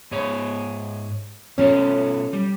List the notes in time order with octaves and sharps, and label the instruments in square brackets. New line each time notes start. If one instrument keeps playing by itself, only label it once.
[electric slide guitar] G#2 G#4 C#5
[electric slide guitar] B2 F4 A4 [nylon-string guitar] C#4
[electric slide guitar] G3